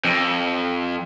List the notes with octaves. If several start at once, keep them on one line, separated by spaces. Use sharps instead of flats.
F2